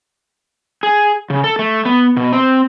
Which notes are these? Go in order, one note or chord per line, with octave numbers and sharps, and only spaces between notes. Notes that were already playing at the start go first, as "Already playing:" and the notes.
G#4
C#3
A4
A3
B3
B2
C4